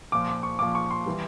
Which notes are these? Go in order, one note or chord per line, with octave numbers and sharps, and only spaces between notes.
A#2 F3 D6
D6
C#6
A#2 F3 D6
C#6
C6
E3 G3